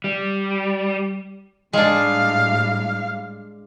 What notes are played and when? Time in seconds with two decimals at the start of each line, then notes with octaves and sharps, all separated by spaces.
0.04 G3
1.73 A2 G3 G#3 D4 F5